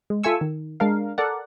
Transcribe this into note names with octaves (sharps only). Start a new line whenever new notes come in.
G#3
F4 A4 E5 G#5 C#6 E6
D#3
G#3 D4 A#4 F5
A4 A#4 D5 F#5